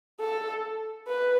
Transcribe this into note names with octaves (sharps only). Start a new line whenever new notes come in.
A4
B4